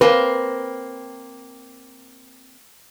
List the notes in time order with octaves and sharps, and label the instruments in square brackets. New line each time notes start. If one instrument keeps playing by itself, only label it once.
[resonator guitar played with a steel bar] A#3 C4 [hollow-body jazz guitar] B4